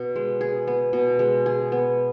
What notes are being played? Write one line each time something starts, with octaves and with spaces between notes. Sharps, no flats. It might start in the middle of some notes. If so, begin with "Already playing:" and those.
Already playing: B2
G#3
G#4
B3
B2
G#3
G#4
B3